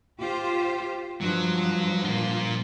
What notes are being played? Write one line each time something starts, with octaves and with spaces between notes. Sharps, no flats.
F4 G4 C5
G2 F3 F#3
A#2 F4